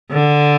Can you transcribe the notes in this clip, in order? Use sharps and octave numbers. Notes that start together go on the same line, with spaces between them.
D3